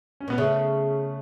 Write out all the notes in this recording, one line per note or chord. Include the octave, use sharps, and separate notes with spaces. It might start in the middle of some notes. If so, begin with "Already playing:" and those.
C#4
B2 B3
C#3 A3